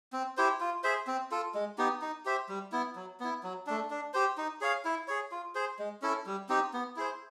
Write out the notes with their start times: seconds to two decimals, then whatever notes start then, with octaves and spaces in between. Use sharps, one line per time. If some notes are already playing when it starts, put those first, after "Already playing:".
0.13 C4
0.37 E4 G4 C5
0.60 F4
0.84 G#4 C5 E5
1.07 C4
1.32 F4 A4
1.55 G#3
1.78 B3 D#4 G4
2.02 D#4
2.25 G4 C5 E5
2.49 G3
2.72 B3 E4
2.96 F#3
3.20 B3 E4
3.43 F#3
3.67 A3 D4
3.91 D4
4.14 G4 C5
4.38 D#4
4.61 G#4 C#5 F5
4.85 E4
5.08 G#4 C#5
5.32 F4
5.55 G#4 C5
5.79 G#3
6.02 C#4 E4 A4
6.26 G3
6.49 C4 D#4 G4
6.73 B3
6.97 E4 G#4 C5